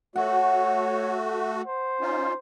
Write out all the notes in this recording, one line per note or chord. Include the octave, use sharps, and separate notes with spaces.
A3 F#4 C#5 F#5
C5
C#4 D#4 F4